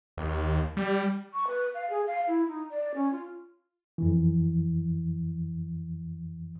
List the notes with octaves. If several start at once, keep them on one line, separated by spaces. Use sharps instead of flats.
D#2
G3
C#6
B4
F5
G#4
F5
E4
D#4
D5
C#4
F4
F2 E3